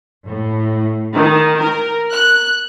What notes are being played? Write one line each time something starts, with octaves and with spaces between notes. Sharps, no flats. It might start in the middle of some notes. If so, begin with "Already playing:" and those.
A2
D#3
A#4
F#6